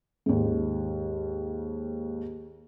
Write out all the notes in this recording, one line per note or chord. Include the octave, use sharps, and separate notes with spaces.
D#2 G#2